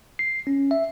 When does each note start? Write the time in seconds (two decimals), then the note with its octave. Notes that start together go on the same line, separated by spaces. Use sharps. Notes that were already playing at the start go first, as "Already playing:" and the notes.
0.19 C7
0.47 C#4
0.71 E5